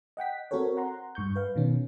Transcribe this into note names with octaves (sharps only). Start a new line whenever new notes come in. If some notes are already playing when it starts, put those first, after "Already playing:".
D#5 F#5 G5 B6
C4 F#4 A4 A#4 C#5
F#5 A#5 C6
G2 C#6 G6
B4 F5
B2 D#3 C#4